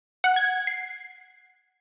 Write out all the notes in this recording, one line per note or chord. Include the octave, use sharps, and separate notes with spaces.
F#5
G#6
C7